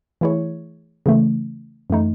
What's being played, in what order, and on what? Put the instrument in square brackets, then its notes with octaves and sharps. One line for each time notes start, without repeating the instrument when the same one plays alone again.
[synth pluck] E3 A3 E4 G#4 C#5
C#3 E3 A3
F#2 E3 A3 D#4